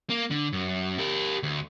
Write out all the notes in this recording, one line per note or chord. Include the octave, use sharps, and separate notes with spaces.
A#3
D3
F#2
G4 A#4
D2